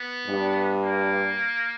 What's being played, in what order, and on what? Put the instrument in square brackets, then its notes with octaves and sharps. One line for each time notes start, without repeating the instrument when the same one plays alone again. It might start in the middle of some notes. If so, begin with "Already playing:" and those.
Already playing: [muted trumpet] B3
[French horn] G2
[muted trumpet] A#3